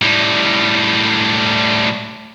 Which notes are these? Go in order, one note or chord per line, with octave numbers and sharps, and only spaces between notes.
A2 G3